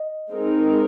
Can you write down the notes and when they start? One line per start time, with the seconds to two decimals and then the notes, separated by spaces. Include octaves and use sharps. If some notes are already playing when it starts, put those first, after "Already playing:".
Already playing: D#5
0.31 G#3 C4 D#4 A#4